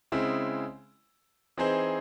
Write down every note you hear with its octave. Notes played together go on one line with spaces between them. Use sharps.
C#3 G#3 C4 E4
E3 C4 D#4 G#4 C5